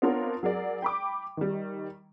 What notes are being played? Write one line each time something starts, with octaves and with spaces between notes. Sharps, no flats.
B3 C4 D4 F4 A#4 C#5
F#3 G#4 A#4 D5
G5 B5 D6
D#3 G3